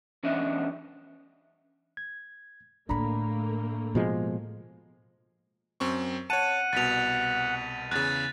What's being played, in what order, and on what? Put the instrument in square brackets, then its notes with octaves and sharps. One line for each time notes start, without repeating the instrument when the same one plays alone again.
[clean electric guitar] E2 C#4 D4 D#5 E5
[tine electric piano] G#6
[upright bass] A2 D3 [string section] A3 A#3 [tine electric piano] D4 A#5 B5
[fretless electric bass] B2 F3 G#3
[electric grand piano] F#2 C4 C#6
[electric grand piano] C#5 A5 [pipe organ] F#5 [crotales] D#7
[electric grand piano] C2 B2 [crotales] A6 B6 F7
[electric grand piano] E2 C#3 [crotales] F#6 A6